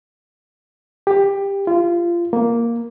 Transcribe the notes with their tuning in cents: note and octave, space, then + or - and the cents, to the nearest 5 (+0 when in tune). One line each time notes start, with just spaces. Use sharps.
G4 +15
F4 -25
A#3 +0